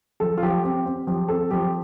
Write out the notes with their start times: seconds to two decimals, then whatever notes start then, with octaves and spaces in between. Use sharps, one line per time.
0.20 F3 A4
0.38 F4
0.43 F3 G4
0.63 C4 G4
0.86 C4
1.07 F3 G4
1.28 C4 A4
1.51 F3 G4